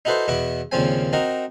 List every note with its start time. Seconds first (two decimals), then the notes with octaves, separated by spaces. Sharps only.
0.05 D#4 E4 F#4 A4 B4 C5
0.28 E2 B2 E4 F#4 D6
0.72 D#2 A#2 C#3 F3 C4 G#5
1.13 C4 D#4 F#4 A#4